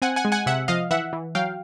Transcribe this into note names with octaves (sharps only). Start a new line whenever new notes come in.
C4 F#5 G#5
F#5 G#5
G#3
F#5 G#5
C3 E5 F#5
F3 D#5 F5
E3 E5 F#5
E3
F#3 F5 G5